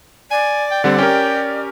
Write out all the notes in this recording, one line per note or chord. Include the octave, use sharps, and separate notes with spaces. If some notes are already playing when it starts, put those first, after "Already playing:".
D5 G#5
G5
D3 G3 C4 F#5
C#4 G4 A#4 G5